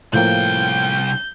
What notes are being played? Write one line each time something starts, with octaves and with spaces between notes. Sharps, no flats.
C2 A2 F3 A#3 G5 G6